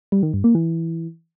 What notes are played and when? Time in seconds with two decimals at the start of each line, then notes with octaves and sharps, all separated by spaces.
0.12 G3
0.23 D#3
0.33 G2
0.44 A#3
0.55 E3